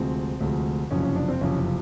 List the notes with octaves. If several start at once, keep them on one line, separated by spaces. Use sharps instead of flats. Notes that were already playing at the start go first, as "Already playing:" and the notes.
Already playing: D2 C3 F3 G#3 C4
D2 C3 F3 G#3
F#1 F2 C3 C#4
C#4
D4
C4
F#1 F2 C3 C#4